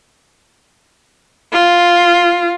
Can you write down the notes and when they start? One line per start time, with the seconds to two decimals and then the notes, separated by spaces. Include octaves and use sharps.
1.53 F4